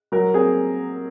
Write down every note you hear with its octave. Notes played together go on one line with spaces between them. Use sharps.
F#3 A#4
C4 G#4